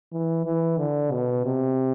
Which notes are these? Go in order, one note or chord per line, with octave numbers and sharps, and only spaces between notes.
E3
E3
D3
B2
C3